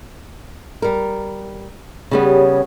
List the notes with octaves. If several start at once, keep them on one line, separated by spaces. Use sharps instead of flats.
G3 A#4
C#3 G3 B3 G4 C#5